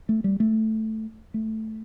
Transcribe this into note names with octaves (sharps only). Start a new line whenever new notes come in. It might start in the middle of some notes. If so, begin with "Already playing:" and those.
A3
G3
A3
A3